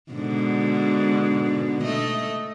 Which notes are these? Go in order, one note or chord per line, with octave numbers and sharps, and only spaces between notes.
G#2 B2 D3
A3 D#5